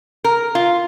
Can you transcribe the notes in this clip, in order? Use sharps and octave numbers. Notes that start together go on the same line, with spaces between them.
A#4
F4